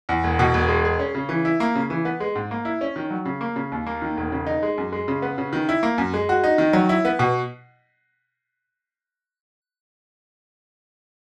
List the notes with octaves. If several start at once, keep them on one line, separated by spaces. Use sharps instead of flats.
E2
E1
B2
E1
G#3
G#4
C#4
C#3
E3
E4
A#3
C#3
E3
B3
G#3
G#2
A#3
E4
C#4
D#3
F#3
C#3
A#3
C#3
D#2
A#3
D#3
E1
C#3
D#4
G#3
F#2
G#3
C#3
B3
C#3
D#3
E4
A#3
F#2
G#3
F#4
D#4
D#3
F#3
E4
B3
B2